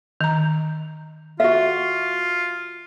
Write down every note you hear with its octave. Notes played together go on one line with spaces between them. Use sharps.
D#3 A#5
F4 F#4 E5